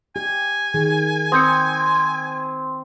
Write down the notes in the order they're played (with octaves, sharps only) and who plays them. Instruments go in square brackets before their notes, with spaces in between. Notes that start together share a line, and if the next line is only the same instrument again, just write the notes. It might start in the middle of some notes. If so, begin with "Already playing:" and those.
[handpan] G4 [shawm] G#5
[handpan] D#3 [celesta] G#4
[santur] C4 [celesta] D#6 G6 C#7